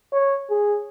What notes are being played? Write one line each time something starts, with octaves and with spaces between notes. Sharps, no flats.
C#5
G#4